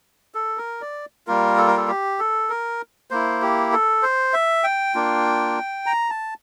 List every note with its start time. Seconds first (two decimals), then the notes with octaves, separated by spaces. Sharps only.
0.34 A4
0.58 A#4
0.81 D5
1.27 G3 A#3 F4 A#4
1.58 A4
1.67 A#4
1.77 A4
1.88 G4
2.19 A4
2.50 A#4
3.11 A#3 E4 C5
3.42 G4
3.73 A4
4.02 C5
4.33 E5
4.64 G5
4.95 A#3 D4 F4
5.86 A#5
6.10 A5